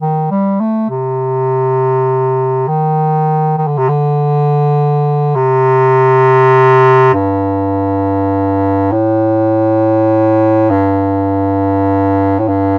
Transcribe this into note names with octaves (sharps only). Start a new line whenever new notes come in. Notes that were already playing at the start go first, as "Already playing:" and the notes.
D#3
G3
A3
C3
D#3
D#3
D3
C3
D3
C3
G2
A2
G2
A2
G2